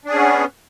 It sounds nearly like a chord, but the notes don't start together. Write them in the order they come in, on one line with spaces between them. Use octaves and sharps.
D4 G#4 C#4 B3